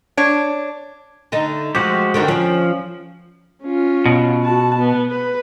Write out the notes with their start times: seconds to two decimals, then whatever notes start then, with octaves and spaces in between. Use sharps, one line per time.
0.17 D4 C#5
1.32 D3 A3 D#4
1.75 F3 G#3 F#4 G4
2.14 D3 D#3 D4
2.28 F3 C#4 D4
3.62 C#4 F4
4.06 B2
4.43 F#4 A5
4.79 B3
5.10 B4